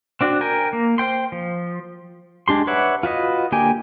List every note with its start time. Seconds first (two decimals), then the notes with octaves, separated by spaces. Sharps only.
0.21 C4 D4 F#4
0.41 A#4 G5 G#5
0.73 A#3
0.98 C5 G5 C6
1.32 F3
2.48 G#3 D4 G4 C6
2.67 B4 C#5 D5 E5 F#5
3.03 F4 F#4 B4 D#5
3.52 D3 A#3 G4 G5 G#5